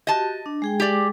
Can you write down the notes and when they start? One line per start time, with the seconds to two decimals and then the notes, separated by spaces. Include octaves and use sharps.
0.07 F#4 G4 D#5 A5
0.46 D4
0.62 G#3 G#4 G5
0.80 G4 D5